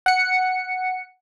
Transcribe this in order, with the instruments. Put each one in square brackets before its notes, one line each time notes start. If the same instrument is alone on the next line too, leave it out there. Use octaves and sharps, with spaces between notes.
[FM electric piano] F#5 C#7